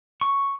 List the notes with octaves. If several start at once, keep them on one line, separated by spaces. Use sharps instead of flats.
C#6